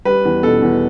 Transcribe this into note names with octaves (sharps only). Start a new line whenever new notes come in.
G3 B4
E2
B2 A4
E2